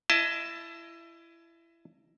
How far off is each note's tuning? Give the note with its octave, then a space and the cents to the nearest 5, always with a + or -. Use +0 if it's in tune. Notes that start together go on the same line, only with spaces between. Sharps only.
E4 +25 D#5 +0 A5 +0